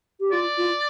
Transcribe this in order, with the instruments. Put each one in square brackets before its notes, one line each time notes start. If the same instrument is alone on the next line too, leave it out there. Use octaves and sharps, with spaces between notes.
[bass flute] G4
[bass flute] F4 [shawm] D5
[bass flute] F4